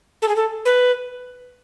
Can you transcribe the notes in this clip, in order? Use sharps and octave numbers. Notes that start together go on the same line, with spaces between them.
A4
G#4
A4
B4